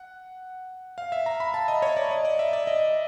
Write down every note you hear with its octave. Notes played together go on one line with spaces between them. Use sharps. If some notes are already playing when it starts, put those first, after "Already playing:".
Already playing: F#5
F5
E5
A#5
B5
A5
D#5
C#5
D5
D#5
D5
E5
D5
D#5